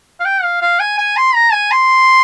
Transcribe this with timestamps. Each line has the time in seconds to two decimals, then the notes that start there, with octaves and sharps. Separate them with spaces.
0.20 F5
0.25 G5
0.43 F5
0.62 F5
0.80 G#5
0.98 G#5
1.17 C6
1.34 A#5
1.52 G#5
1.71 C6